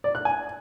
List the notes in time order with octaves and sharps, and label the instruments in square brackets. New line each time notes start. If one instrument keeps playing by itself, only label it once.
[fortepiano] D5
F#6
G#5